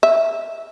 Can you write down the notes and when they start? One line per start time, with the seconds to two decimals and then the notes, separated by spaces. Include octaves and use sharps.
0.03 E5